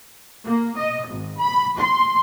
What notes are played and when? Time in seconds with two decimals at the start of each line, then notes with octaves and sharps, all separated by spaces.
0.45 A#3
0.77 D#5
1.07 G#1
1.39 B5
1.78 C6